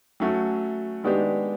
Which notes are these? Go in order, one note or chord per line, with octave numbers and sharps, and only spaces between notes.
F#3 A3 C#4 F#4
D#3 G#3 B3 D4 G4